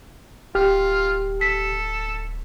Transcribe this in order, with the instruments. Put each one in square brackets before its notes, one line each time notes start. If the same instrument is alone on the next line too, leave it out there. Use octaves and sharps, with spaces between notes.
[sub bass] D1 [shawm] F4 [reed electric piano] G4 F6
[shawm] A4 [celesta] B6